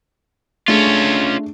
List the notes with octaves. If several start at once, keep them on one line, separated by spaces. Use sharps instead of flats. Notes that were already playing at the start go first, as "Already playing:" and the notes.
A3 C#4 D4 F4 G#4